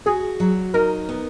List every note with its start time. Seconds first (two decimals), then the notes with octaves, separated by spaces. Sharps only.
0.06 F#4 G#4
0.40 F#3
0.74 D#4 A#4
1.09 B3